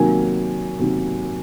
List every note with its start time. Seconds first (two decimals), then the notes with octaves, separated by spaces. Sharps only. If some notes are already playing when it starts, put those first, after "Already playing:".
Already playing: C3 D#3 F#3 A#3 G#5
0.79 C3 D#3 F#3 A#3